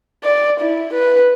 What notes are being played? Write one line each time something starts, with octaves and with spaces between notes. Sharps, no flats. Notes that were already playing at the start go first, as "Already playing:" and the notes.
D5
E4
B4